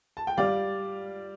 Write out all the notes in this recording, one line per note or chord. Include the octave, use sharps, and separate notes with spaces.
A5
G5
G3 D5 F5